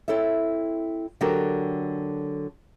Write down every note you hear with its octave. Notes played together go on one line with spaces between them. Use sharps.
C4 E4 A4 C#5 E5
D3 F#3 F#4 G4 A4 A#4